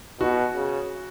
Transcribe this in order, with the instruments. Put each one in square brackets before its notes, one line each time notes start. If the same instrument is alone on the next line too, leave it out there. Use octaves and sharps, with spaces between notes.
[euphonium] B2 [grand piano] F#4
[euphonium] C#3